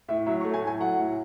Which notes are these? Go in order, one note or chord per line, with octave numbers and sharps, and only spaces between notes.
A2 E5
F#3 E5
C#6
A3
G#5
A2
G#5
F#3 F#5
A2